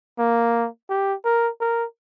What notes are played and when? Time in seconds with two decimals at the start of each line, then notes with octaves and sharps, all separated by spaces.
0.19 A#3
0.90 G4
1.25 A#4
1.60 A#4